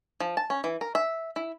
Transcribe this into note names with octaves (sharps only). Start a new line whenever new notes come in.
F3
A5
C#4
E3
A#4
E5
E4